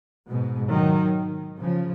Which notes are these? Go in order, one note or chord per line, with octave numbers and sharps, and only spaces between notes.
G#2 B2
D#3 F#3
C#3 F3